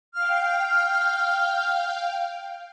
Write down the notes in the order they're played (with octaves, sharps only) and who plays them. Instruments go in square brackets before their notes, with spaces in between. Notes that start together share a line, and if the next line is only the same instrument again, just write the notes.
[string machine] F5 G5 [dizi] F6